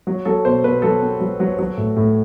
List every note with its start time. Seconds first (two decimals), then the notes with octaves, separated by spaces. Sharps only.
0.07 F#3
0.25 F#3 A4
0.45 B2 C5
0.64 B2 B4
0.82 F#3 A4
1.02 C4
1.21 F#3
1.40 F#3
1.59 F#3
1.77 A2
1.96 A2